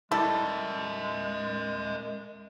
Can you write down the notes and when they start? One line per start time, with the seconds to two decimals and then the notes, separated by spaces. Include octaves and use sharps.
0.11 G3 G#3 E4 A4 A#4 E5